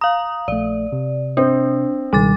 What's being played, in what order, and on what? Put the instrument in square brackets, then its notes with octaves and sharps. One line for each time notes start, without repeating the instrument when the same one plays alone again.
[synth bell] F5 D#6 [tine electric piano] A#5
[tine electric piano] A#1 A3 [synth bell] D5
[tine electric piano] C3
[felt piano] C4 [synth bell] D4
[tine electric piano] C#2 B2 D#3 [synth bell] G3 D6 A6